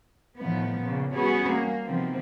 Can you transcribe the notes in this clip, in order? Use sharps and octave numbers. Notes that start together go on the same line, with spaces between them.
A2 D#3 F3 B3
A#2 C#3
G3 B3 C#4 F#4 G#4
A#3
C3 D#3 F3 B3 C4